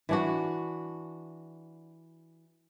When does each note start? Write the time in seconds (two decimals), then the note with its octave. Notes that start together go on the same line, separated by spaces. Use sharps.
0.09 E3 D4 F#4